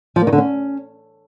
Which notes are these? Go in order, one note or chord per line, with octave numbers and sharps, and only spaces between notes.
F3
A#3
D#3
D3
C#4